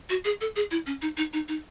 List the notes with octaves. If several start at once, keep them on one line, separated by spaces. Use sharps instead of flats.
F#4
G#4
A4
G#4
E4
C#4
D#4
D#4
D#4
D#4